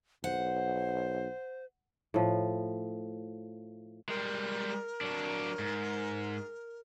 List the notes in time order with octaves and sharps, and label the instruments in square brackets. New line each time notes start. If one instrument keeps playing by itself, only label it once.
[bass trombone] B1 [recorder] C5 [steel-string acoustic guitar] F#5
[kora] A2 F3
[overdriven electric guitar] G3 G#3 [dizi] A#4
[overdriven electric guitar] F#3 D4
G#2